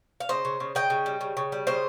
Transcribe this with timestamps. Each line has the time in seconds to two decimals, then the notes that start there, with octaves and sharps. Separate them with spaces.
0.20 F5
0.29 C#3 C5 D#5
0.45 C#3
0.60 C#3
0.75 C#3 D#5 G5
0.90 C#3
1.06 G3
1.21 C#3
1.37 C#3
1.52 G3
1.67 C#3 C5 D#5